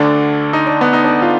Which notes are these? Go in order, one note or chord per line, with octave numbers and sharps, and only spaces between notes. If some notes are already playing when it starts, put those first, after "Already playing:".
Already playing: D2 D3 D4
D#4
D4
B3
D#4
D4
F4